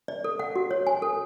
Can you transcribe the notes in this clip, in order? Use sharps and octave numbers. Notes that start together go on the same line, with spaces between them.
D5
A4
F#5
F#4
C#5
G#5
A4